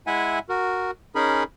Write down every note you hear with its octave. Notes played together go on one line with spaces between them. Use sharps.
G#3 E4 E5 F#5 G#5
F#4 A#4
C#4 D#4 G#4 A#4 B5